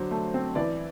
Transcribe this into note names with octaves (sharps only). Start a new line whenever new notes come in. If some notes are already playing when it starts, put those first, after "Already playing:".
Already playing: D3 F#3 D4 C5
A3
C4
E3 D5